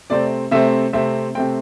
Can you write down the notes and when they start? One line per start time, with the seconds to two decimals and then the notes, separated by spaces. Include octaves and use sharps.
0.10 C3 A3 C4 D5
0.51 C3 A3 C4 E5
0.93 C3 A3 C4 E5
1.35 C3 A3 C4 G5